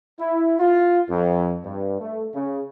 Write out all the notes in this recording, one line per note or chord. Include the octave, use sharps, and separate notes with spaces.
E4
F4
F2
G2
A3
C#3